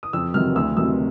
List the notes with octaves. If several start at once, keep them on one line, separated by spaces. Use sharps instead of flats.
D#6
F2 E6
C3 D#3 F#3 F6
D2 E6
C3 D#3 F#3 E6